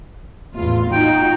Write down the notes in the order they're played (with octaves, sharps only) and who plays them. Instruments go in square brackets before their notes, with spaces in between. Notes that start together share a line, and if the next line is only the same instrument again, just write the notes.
[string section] A1 E2 F4
[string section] D#4 F4 F#4 [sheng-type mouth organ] G5